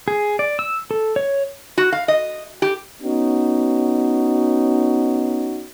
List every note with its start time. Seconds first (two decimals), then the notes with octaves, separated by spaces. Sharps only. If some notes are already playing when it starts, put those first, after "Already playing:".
0.08 G#4
0.39 D5
0.59 E6
0.91 A4
1.16 C#5
1.78 F#4
1.92 F5
2.08 D#5
2.62 G4
3.02 B3 C#4 D#4 F#4